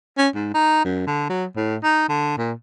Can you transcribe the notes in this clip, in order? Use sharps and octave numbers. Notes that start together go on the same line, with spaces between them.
C#4
G#2
D#4
F#2
D3
F#3
A2
D#4
D3
A#2